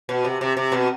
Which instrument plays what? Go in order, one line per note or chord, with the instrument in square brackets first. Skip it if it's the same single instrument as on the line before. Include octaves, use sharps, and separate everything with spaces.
[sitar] B2
C3
C3
C3
B2